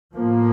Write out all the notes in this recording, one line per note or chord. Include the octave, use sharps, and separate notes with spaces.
A2 F3 A#3